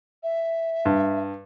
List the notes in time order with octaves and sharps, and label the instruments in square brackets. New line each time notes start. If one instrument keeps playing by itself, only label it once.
[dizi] E5
[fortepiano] G2